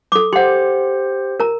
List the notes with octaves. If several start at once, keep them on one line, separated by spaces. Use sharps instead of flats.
A4 D6
G4 C5 F#5 C6
A#4 A#5